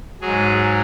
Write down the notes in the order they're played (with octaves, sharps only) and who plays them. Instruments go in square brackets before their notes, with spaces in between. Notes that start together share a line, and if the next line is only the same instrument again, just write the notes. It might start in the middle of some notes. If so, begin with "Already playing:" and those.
[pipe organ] G#2 F#3 G#4